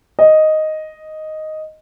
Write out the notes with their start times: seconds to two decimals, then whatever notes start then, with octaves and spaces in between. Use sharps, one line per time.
0.19 D#5